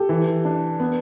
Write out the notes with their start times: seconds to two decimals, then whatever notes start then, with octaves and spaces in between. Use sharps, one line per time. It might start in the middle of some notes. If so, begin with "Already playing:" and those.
Already playing: G4 A4
0.09 E3
0.45 D4
0.80 B3